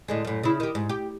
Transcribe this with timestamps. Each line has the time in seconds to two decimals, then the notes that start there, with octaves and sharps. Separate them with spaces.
0.08 A2 D3 G#3
0.25 F#2 A2
0.43 C#3 E4
0.60 D#3 G4
0.75 G#2
0.89 G4